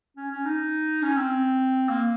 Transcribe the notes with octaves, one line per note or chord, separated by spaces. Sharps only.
C#4
C#4
D#4
C#4
C4
A#3